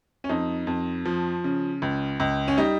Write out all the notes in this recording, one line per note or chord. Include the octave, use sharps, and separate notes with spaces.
C#4
F2 D#4
F2
F3
C#3
C#2
C#2
C#4
G3 D#4